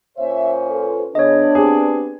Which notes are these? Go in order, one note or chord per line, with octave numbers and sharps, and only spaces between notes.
A#2 C#4 C5 C#5 E5
F4 A4 B4
C#3 B3 D4 G#4 C#5 D#5
C4 G4 G#4 B4